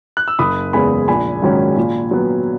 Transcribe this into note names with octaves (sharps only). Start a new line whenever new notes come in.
F#6
E6
F#1 B5 D#6
E2 C#3 G#3 B3 G#5 B5
A#1 G#5 B5
G#2 D#3 F#3 C#4
A#2
F#3 B3